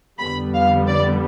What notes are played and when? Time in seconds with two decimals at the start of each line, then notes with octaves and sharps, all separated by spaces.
0.19 F2 D3 G3 B3 B5
0.54 F5
0.87 D5